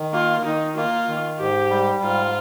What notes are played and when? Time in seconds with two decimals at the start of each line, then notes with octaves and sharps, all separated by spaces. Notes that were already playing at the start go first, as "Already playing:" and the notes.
Already playing: D#3
0.13 A#3 F4
0.45 D#3 D#4
0.77 A#3 F4
1.08 D#3
1.40 G#2 G4
1.70 G3
2.02 G#2 F4